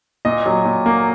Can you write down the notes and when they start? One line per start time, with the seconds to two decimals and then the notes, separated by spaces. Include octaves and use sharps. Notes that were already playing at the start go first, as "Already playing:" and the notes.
0.25 A#2 D#5
0.46 F#3
0.65 A#2
0.86 A#3